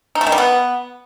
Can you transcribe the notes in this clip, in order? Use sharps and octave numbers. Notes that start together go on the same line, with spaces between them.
D#4
A3
D#3
G3
B3